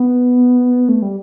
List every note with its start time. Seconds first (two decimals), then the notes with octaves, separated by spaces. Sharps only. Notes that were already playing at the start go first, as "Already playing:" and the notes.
Already playing: B3
0.89 A3
1.02 G3